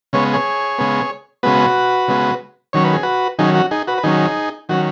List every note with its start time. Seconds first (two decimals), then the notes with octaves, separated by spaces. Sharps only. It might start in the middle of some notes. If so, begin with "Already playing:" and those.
0.13 C#3 G#3 B3 C#5
0.33 G#4 C#5
0.79 C#3 G#3 B3
1.43 C#3 G#3 B3 F#4 B4
2.08 C#3 G#3 B3
2.73 D#3 F#3 C#4 C#5
2.84 B4
2.93 G#4
3.03 F#4 B4
3.39 D#3 F#3 C#4 D#4 G#4
3.55 F#4
3.71 D#4 G#4
3.87 F#4 B4
3.98 B4
4.04 D#3 F#3 C#4 D#4 G#4
4.69 D#3 F#3 C#4 F#4